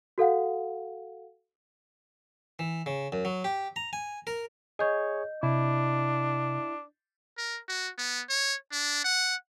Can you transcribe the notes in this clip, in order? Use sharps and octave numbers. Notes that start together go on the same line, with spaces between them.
F#4 A4 F5 F#5
E3
C#3
F#2
F#3
G4
A#5
G#5
A#4
G#4 C#5 D#5 G6
C3 D4 E4
A#4
F#4
B3
C#5
D4
F#5